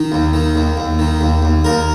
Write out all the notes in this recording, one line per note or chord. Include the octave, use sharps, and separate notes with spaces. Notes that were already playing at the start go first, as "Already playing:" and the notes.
Already playing: D#3
D#2
D#3
D#2
D#2
D#3
D#2
D#2
D#2 A#4